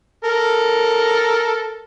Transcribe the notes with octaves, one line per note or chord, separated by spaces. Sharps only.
A4 A#4